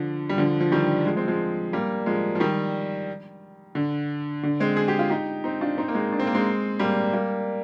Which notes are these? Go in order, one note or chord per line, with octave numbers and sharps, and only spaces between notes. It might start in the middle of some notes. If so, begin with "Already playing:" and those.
Already playing: D3 F3
G3
D3 F3
F3
D#3 G3
F3 G#3
G#3 C4
F3 G#3
G3 A#3
F3 G#3
F3
D#3 G3
D3
D3
G#3 C4
G#4
G4
F4
D#4 G4
C4 D#4
D4 F4
C4 D#4
A#3
G#3 C4
D4
C4
A#3
G#3 C4
G3 A#3
G3 A#3